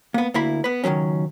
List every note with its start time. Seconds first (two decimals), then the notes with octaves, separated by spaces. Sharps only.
0.14 A#3 B3
0.34 D2 A#3 E4 B5
0.64 B3 B4
0.84 C#2 D#3 E3 F#3 C#4